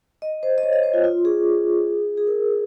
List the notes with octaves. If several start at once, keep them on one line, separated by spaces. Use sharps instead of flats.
D#5
C5
D#5
C#5
D#5
C5
F4
F4
G#4
G#4
A#4